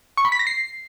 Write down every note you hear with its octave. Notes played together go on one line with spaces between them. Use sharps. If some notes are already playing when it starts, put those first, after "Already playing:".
C#6
B5
B6
A#6
C7